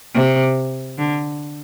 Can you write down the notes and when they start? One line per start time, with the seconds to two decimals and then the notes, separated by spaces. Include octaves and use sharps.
0.15 C3
0.98 D3